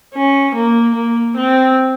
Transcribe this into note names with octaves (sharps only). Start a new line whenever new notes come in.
C#4
A#3
A#3
C4